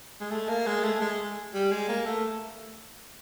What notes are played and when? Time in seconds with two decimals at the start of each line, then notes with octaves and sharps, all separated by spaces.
0.20 G#3
0.31 A3
0.49 A#3
0.66 G#3
0.83 A3
1.01 G#3
1.54 G3
1.71 G#3
1.88 A#3
2.05 A3